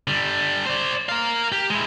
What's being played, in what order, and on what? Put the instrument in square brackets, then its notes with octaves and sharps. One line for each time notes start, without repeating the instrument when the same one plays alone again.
[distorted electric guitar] D3 G3
C5 D5
A#4 F5
G4
G#3 E4